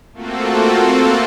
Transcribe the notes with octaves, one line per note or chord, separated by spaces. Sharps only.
A3 A#3 C4 F4 F#4 A4